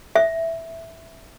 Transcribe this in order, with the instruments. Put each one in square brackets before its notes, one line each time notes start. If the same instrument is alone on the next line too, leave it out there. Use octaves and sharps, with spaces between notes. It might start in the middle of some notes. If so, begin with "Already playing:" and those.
[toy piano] E5